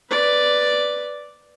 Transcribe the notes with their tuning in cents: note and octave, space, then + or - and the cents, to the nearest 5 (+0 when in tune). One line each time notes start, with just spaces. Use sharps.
B4 +0 D5 +0